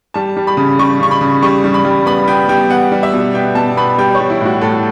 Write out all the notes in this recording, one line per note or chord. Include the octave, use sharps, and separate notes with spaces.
G3 A5
G3
B5
C#3
G3 C#6
C#3 C#6
B5
C#3
G3 C#6
G3
B5
G3
B3 B5
B3 G5
G3 G5
B3 F#5
G3
E5
B2
B3 G5
B2 A5
B3 B5
G3 G5
C#5
G3
E4
A2 F#4
A2 A4